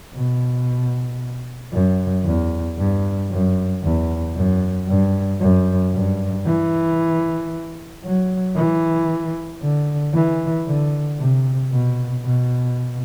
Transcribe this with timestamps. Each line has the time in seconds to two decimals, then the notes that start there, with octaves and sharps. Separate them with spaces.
0.14 B2
1.72 F#2
2.25 E2
2.77 G2
3.30 F#2
3.83 E2
4.35 F#2
4.87 G2
5.40 F#2
5.93 G2
6.46 E3
8.04 F#3
8.56 E3
9.61 D3
10.13 E3
10.66 D3
11.19 C3
11.71 B2
12.24 B2